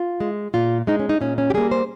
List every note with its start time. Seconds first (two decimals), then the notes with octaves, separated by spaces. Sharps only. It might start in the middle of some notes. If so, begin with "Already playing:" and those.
Already playing: F4
0.20 G#3
0.54 A#2 F4
0.87 G#3 D#4
1.00 C#4
1.09 D#4
1.21 A#2 C#4
1.38 C#4
1.50 G4
1.54 G3 A#3 G#4
1.71 C5